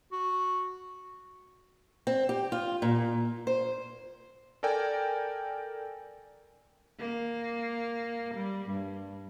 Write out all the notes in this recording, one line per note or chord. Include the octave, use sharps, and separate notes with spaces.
F#4
C4
G4
F4
A#2
C5
A4 A#4 D5 G5 G#5
A#3
G3
G2